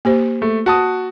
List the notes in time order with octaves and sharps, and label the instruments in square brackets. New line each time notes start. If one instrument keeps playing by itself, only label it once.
[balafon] A#3 G4 C5
[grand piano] A3
F#4 A5 D#6